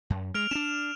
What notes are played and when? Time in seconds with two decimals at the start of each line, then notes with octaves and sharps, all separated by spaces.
0.10 F#2
0.34 G#3 F6 D7 F7
0.51 C#4 D4 E7